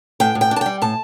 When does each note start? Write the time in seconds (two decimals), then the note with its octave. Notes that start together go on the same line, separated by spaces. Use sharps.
0.20 A2 G5
0.35 A2
0.41 G5
0.51 D4
0.56 A5
0.61 G3 G5
0.82 A2 A5